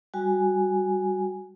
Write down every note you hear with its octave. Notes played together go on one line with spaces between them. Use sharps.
G3 F#4 G#5